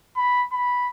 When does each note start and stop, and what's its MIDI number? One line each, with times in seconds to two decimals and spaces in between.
0.17 0.43 83
0.53 0.88 83